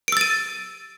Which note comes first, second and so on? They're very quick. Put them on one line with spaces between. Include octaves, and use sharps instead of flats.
D7 E6 A6 D#7